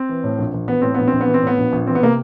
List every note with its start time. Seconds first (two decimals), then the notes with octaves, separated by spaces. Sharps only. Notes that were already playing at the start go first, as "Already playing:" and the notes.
Already playing: C4
0.09 E3
0.24 A2
0.39 A#1
0.54 A#1
0.68 E3 B3
0.82 A2 C4
0.95 A#1 B3
1.07 A#1 C4
1.21 B3
1.27 E3
1.34 C4
1.42 A2 B3
1.57 A#1
1.72 A#1
1.87 E3 C4
1.95 B3
2.01 C3 A#3